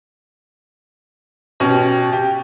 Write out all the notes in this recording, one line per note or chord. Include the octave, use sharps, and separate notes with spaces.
B2 C#4 G4
G4